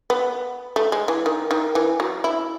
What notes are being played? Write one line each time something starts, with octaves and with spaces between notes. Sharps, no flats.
B3
A3
G#3
E3
D#3
D#3
E3
F#3
E4